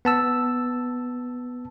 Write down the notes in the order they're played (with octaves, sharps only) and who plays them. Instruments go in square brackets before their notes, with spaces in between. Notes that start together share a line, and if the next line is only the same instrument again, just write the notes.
[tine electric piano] B3 A5 E6